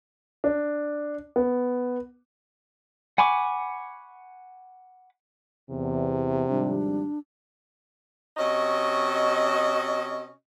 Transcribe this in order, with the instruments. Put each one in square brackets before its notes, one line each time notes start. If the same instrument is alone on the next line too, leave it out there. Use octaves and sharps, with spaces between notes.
[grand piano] D4
B3
[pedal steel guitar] F#5 G#5 B5 C#6 D6
[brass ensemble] E2 [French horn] C3
[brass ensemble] G#1 F3 G3 [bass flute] D4
[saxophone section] C3 C#4 F#4 D#5